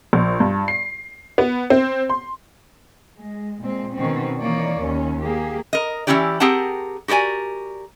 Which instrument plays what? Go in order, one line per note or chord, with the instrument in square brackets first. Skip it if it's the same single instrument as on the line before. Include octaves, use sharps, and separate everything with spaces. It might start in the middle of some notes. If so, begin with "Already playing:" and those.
[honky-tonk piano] A#1
G2
C7
B3
C4
C6
[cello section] G#3
A#2 G#3 C4
B2 D#3 C4 C#4
E3 A#3 D#4 C#5 D5
D#2 C#4
A#3 G4 G#4
[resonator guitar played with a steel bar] A#4 D#5
E3 G#3 C#4 E4 G4 D5
C4 G4 G#4 A#4 F#5 A5
F#4 G4 A#4 D5 G#5